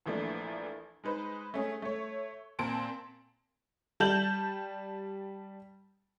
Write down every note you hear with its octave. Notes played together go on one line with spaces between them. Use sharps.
A#1 E3 F3 A3 A#3 D4
G#3 D#4 B4 C5
A3 C#4 G#4
A3 C#5
A#2 A#3 C4 A5 D7
G3 A5 G6 F#7